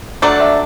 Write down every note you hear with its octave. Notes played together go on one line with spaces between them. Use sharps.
F#3 A3 D4 D5
E5